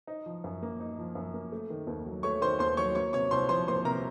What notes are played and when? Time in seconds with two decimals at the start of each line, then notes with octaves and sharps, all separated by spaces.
0.07 D#4
0.26 F3
0.44 F#2
0.63 A#3
0.80 D#4
0.99 F3
1.15 F#2
1.34 A#3
1.52 A3
1.70 D#3
1.87 D#2
2.06 F#3
2.23 A3 C#5 C#6
2.41 D#3 C5 C6
2.59 D#2 C5 C6
2.77 F#3 C#5 C#6
2.95 A#3 C#5 C#6
3.13 C3 C#5 C#6
3.31 C2 C5 C6
3.49 F3 C5 C6
3.68 A#3 C5 C6
3.85 C3 A#4 A#5